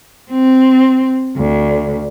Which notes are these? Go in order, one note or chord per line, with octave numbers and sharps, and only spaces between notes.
C4
D2